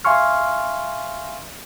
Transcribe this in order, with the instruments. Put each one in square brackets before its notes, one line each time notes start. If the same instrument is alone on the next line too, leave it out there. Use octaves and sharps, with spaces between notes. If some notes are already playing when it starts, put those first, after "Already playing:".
[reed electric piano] E5 F5 G#5 C6 C#6 F6